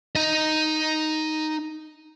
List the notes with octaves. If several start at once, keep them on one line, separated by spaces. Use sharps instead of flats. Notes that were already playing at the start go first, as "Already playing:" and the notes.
D#4 D#5